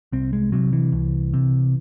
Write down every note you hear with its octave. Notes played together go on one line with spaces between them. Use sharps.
C2 C4
G#3
C3 F#3
E3
C2
C3